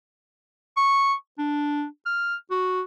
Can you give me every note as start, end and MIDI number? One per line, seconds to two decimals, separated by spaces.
0.77 1.14 85
1.38 1.86 62
2.06 2.35 89
2.51 2.82 66